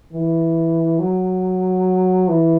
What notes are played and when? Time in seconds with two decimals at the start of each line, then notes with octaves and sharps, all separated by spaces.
0.13 E3
0.99 F#3
2.29 E3